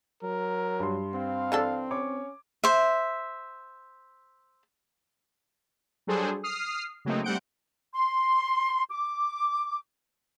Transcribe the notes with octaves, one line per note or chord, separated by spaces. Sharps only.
F#3 A#4
G2 C6
C4 F5
E3 D4 A4
C#4 C#5 D6
C5 E5
F#3 G3 D4 G#4 A4 C5
D#6 F6 C7
C#3 F#3 A3 A#3 C4 D#4
G3 A3 C4 F#5 G6 D7
C6
D6